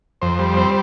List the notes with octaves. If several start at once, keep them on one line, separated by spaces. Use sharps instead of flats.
F2 C5
G3
C4